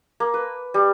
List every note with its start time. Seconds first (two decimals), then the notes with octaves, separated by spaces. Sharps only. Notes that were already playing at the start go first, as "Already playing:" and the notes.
0.20 A#3
0.34 B4
0.74 G3